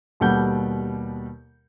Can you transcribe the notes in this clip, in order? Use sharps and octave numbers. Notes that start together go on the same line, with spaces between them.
D#2 B2 G3 A4 F#5 G6